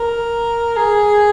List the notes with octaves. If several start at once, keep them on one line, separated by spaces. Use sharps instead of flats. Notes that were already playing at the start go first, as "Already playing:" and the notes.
Already playing: A#4
G#4